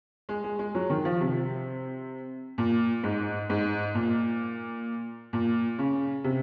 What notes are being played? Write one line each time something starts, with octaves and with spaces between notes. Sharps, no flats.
G#3
G#3
G#3
F#3
D#3
F3
C3
A#2
G#2
G#2
A#2
A#2
C#3
C3